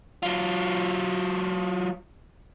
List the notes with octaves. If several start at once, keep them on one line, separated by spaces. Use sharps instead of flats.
F#3 F4